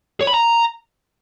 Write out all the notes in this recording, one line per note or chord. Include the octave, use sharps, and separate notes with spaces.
C#5
B5
A#5